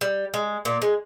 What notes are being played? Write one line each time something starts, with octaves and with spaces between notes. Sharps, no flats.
G3
G#3
A#2 A#3
G#3